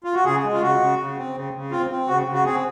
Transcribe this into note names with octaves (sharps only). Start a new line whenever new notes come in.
F4
F#4
C#3 G#4
G#3
F4
C#3 F#4
C#3
C#3
C4
C#3
C#3
C4 F4
C4
C#3 F#4
C#3
F#4
C4 G#4